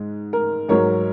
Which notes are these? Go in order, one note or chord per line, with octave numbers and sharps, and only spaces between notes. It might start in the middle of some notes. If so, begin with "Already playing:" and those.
Already playing: G#2 G#3
A#4
G#2 F#3 A#4 C#5